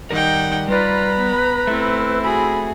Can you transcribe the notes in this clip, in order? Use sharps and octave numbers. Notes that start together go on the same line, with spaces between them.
D#3 G3 D#4 A#4 F#5 G5
G3 F4 B4 D5 A#5 B5
B3
A3 C4 E4
F#4 G#4 B5